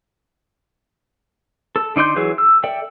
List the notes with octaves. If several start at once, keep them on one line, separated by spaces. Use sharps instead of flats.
A4
D3 D#4 D5 C6 G6
E3 F#3 G#4
E6
A4 D5 E5 G5